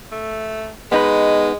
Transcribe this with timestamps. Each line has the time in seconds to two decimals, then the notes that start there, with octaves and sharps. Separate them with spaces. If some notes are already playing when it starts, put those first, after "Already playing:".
0.12 A3
0.92 G#3 B3 D#4 B4